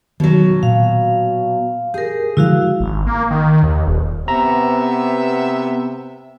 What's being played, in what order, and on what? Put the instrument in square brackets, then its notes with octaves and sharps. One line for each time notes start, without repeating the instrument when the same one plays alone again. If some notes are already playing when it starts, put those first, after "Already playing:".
[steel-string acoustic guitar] B2 F#3 [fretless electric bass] D#3
[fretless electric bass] A#2 [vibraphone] F5
[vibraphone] G4 A#4 [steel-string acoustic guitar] G#4
[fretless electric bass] D3 F3 G#3 [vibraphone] E4 F#4 F5
[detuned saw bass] G#1
A#3
D#3
D#2
D#1
[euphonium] C3 [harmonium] B3 [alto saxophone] E5 [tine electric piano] A#5